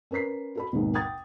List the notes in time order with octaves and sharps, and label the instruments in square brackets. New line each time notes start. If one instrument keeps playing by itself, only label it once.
[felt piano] C#4 A#4 B4 B6 C7
F#4 A4 B5
G#1 D#2 G#2 B2
F#5 G5 D#6 G#6 A6